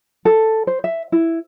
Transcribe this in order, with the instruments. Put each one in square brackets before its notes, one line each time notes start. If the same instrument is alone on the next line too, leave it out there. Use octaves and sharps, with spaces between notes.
[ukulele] A4
C5
E5
E4